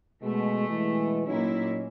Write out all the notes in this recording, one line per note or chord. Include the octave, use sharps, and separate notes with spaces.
B2 G#3 A3
B2 E3 G#3
A#2 F#3 C#4 D#4 E4